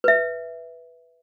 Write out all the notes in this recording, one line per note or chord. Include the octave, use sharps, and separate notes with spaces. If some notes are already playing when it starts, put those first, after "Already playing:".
B4 E5